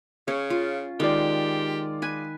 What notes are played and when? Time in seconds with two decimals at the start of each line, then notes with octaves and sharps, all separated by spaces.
0.28 C#3 C#4 C#5
0.50 F4
1.00 D#3 G#3 F4 G4 D5
2.02 B4 G#5